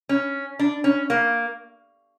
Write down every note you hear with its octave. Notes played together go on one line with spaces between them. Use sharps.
C#4
D4
C#4
A#3